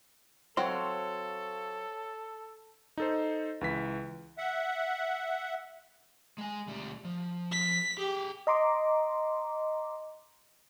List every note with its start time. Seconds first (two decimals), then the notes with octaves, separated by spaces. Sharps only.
0.57 F#3 C4 A4 C#5 F5 C6
2.98 D#4 A4 C5
3.61 C#2 E3 B6
4.38 E5 F#5
6.38 G#3 G#5
6.67 D2 G3
7.05 F3
7.52 B6
7.99 G4 G#4 G5
8.47 D#5 A#5 C6 D6